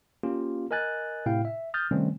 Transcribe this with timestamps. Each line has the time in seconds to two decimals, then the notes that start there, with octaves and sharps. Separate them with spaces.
0.23 A#3 C#4 F4 G4
0.71 A#4 D#5 G#5 F#6 A6
1.26 A2 C3 E4 F5 G5
1.45 E5
1.74 D#6 F6 G6 A6
1.91 C3 D#3 G3 A3 C4 C#4